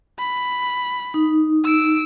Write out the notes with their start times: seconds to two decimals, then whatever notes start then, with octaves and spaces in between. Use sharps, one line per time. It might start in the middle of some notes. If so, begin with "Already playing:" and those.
0.19 B5
1.14 D#4
1.64 E6 D7